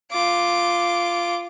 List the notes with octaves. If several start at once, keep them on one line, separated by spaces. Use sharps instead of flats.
F4 D6